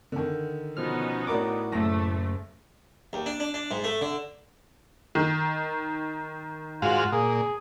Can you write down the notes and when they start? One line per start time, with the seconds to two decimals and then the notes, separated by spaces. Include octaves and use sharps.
0.12 D3 D#3
0.77 B2 F3 B3 C#4 D#4 F6
1.27 A2 F#4 A#4 D5 D6
1.72 F#1 A3 A#6
3.13 D#2
3.26 D4
3.40 D4
3.54 D4
3.71 G#2
3.84 A3
4.01 D3
5.15 D#3
6.82 G#2 F4 F#4 F5
7.12 A#2 G#4